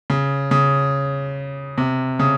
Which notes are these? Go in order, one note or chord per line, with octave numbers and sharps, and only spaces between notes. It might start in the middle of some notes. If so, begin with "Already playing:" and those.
C#3
C#3
C3
C#3